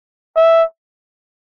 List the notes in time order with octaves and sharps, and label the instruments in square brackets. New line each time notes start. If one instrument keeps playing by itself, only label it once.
[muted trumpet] E5